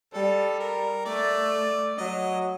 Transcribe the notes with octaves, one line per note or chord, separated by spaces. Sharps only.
G3 A4
A#4
A3 D5
F#3 D#5